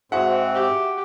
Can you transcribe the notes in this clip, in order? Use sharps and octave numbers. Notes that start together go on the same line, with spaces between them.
G#2 C4 F#4 G#4 E5 F#5
G4